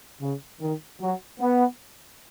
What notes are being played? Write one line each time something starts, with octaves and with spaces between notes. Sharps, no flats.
C#3
D#3
F#3
B3